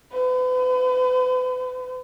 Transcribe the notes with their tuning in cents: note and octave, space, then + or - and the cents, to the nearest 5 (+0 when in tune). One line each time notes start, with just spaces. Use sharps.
B4 +40